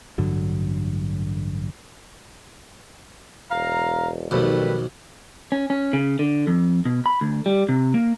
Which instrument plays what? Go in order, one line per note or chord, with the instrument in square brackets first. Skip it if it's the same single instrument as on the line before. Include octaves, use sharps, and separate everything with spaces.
[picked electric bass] A1 G2 D3 F#3
[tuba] E1 [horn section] F5 A#5
[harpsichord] B1 F2 [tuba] D#3 [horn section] G3 A3 B4
[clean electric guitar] C#4
C#4
C#3
D3
F2
B2
B5
D2
G3
C3
A#3